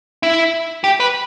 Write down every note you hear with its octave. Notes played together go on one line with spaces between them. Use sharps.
E4
G4
B4